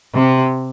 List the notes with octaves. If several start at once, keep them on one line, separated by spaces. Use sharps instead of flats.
C3